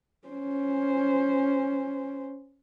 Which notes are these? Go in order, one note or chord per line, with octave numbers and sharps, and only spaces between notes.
C#4 C5